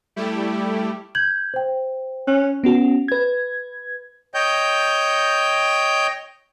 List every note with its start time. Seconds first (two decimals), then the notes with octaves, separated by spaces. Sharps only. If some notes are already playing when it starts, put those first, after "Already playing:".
0.16 G3 A3 E4 G4
1.15 G6 G#6 F#7
1.54 C5 G5
2.27 C#4 F#6
2.64 B3 C#4 F#4
3.08 B4 G#6
4.34 C#5 D#5 G5 G6